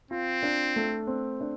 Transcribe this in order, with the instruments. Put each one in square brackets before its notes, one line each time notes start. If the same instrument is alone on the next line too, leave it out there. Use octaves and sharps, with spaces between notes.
[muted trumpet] C4 [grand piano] F4
[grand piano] D4
A3
C4
D4